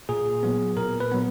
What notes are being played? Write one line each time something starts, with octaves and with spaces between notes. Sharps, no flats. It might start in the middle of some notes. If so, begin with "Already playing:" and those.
A#2 G#4
F#3 B3
A#2 A#4
B4
F#3 B3